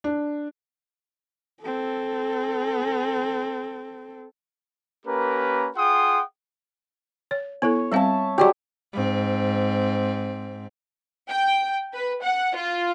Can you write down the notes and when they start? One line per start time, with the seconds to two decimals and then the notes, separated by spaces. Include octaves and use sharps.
0.04 D4
1.61 C4 A4
5.06 A#3 C#4 G4 A#4 B4
5.76 F4 G#4 F#5 G5 C6 D#6
7.31 C#5
7.62 B3 E4 A4 C#5
7.92 G3 C4 E5 F5 A5
8.38 F#3 G#3 F#4 G4 D5 C#6
8.94 G#2 C4
11.28 G5
11.93 B4
12.22 F#5
12.55 F4